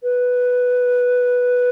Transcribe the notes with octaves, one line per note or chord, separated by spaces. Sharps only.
B4